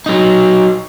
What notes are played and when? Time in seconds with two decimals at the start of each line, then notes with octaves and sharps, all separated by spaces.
0.06 F#3 D#4